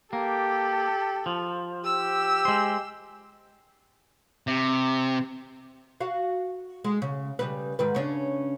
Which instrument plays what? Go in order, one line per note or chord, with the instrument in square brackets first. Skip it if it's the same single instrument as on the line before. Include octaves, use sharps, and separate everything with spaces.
[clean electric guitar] A#3 [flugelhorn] G4 [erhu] A4
[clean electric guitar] F3
[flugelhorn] G4 [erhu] E6
[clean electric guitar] G#3 C5
[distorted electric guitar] C3
[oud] F#4 F5
G#3
C#3
C#3 G3 B4
G#2 D#3 B4
C#3 C#4 D4